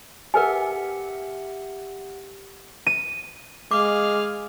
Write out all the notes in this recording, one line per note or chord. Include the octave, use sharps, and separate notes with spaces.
G4 A#4 B4 E5 F#5 G#5
D#7
G#3 G#4 F5 D6